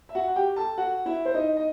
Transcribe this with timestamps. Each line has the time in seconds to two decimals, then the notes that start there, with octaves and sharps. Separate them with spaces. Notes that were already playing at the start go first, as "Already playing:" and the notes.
0.09 E5
0.15 F#4 F#5
0.28 F#5
0.36 G4 G5
0.56 A4 A5
0.78 F#4 F#5
1.06 E4 E5
1.25 C5
1.34 D#4 D#5
1.57 D#5